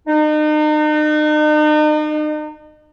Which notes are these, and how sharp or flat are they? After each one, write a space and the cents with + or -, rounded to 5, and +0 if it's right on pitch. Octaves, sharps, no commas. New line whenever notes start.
D#4 -40